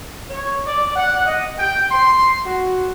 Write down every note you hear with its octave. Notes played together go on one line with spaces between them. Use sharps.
C#5
D5
F#5
D#5
G5
C6
F#4